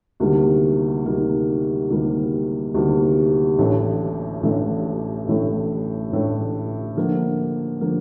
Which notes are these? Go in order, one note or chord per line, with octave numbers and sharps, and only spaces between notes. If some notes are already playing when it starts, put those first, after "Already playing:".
D2 C3 D#3 G3 A#3
D2 C3 D#3 G3 A#3
D2 C3 D#3 G3 A#3
D2 C3 D#3 G3 A#3
A1 A2 A3 D4
A1 A2 A3 D4
A1 A2 A3 D4
A1 A2 A3 D4
D3 F3 A#3
D3 F3 A#3